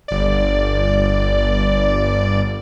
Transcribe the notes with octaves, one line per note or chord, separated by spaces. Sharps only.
G1 D5